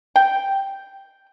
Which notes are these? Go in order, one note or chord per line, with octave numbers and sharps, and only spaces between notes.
G5